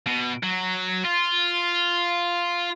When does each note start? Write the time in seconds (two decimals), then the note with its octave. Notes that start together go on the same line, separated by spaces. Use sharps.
0.07 B2
0.43 F#3
1.05 F4